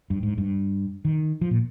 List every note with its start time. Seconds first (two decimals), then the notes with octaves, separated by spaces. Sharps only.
0.10 G2
0.23 G#2
0.38 G2
1.05 D#3
1.41 F3
1.51 A#2